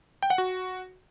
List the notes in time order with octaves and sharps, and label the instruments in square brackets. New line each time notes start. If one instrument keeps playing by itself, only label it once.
[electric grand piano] G5
F#5
F#4